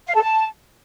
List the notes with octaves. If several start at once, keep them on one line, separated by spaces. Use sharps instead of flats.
F5
A4
A5